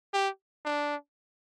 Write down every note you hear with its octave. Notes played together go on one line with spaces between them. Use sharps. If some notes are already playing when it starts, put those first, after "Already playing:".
G4
D4